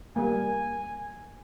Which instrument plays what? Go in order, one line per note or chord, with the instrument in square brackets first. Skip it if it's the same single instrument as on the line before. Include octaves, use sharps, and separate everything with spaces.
[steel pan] G3 A#3 [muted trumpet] G#5